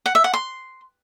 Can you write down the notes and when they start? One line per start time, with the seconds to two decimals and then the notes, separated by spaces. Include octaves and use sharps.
0.06 F#5
0.15 E5
0.24 F#5
0.34 C6